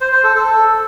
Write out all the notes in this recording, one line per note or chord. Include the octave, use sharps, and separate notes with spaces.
C5
C5
A4
A4